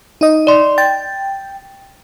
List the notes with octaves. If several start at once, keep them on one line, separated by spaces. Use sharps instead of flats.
D#4 D#5
D5 C6
G5 A6